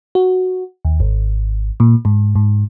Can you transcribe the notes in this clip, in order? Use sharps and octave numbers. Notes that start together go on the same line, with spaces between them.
F#4
D#2
G#1
A#2
G#2
G#2